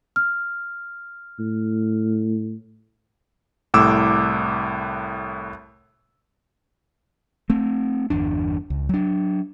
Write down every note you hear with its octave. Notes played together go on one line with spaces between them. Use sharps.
F6
A2
C2 A2 D6 E6
A3 C4
G1 E2 D4
C#2
F#3 D4